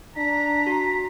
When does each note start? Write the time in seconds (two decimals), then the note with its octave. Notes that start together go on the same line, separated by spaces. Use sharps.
0.17 D4 A#5 B6
0.67 F#4 C7